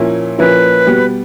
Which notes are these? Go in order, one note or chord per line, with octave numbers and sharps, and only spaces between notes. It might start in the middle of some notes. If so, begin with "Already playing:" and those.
Already playing: A#2 F3 A#3 C#4 E4
A#2 F3 A#3 C#4 E4 B4
B2 G3 B3